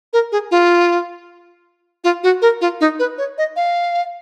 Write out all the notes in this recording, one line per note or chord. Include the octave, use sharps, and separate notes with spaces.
A#4
G#4
F4
F4
F#4
A#4
F4
D#4
B4
C#5
D#5
F5